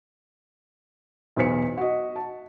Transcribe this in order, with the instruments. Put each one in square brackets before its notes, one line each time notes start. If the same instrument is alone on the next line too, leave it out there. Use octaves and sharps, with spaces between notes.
[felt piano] B1 E2 B4 C5 B6 C#7
F#4 D#5
A5